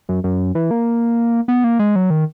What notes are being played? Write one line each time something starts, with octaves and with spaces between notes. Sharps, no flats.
F#2
F#2
E3
A#3
B3
A#3
G#3
F#3
D#3